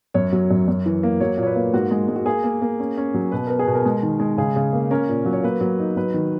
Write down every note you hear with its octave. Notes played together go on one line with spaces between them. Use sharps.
F#2 C#5
F#3
F#2
F#2
E3
A#3
F#3 C#5
A#2
C#5
B4
A#3
G#2 F#4
G#3
G#3
F#4
A#3 G#4
A#3
A#3
C#4
C#4
F#3
B2 B4
B3 A#4
G#4
B2
A#4
G#3
D#3
G#3
C#3 G#4
C#3
A#3
C#4 A#4
A#2
F#3
C#5
A#3 B4
F#3
D#4
F#3 B4
D#3